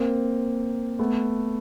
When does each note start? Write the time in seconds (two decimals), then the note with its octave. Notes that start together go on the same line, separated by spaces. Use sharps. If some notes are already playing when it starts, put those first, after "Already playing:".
Already playing: A#3 C4
0.99 A3 B3